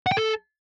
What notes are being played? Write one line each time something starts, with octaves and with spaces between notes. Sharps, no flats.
F#5
G5
A4